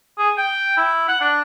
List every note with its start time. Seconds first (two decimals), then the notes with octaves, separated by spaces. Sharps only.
0.18 G#4
0.38 G5
0.77 E4
1.09 F#5
1.21 D4